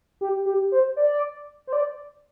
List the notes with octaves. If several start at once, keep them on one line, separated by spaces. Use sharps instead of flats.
G4
G4
C5
D5
C5
D5